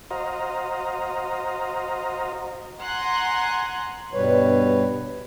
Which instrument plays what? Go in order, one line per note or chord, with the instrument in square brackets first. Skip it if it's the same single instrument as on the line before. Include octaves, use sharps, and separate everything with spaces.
[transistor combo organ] F#4 C5 D#5 F5 A#5
[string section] F#5 G#5 A#5 C6 F#6
[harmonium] G2 B2 G3 B4 C#5